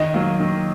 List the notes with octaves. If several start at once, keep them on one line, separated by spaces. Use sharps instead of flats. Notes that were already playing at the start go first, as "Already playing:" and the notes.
Already playing: D#3 D#5
F#3 A#3
D#3